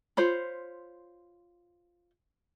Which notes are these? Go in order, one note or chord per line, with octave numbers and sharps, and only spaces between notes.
F4 C5 C#5 B5